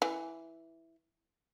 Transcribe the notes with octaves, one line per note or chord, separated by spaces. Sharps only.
E3